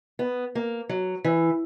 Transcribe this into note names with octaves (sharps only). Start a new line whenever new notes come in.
B3
A#3
F#3
E3